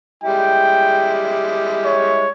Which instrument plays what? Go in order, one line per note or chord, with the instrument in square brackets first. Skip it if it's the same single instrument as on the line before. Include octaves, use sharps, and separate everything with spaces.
[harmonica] G3 G#3 E4 [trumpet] G5
[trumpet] C#5